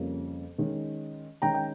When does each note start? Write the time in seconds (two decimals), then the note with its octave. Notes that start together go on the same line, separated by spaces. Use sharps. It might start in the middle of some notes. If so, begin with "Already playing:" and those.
Already playing: F2 C#3 G3 A#3 C#4
0.58 D#3 G#3 C#4
1.42 D#3 G#3 C#4 G5 A#5
1.54 G5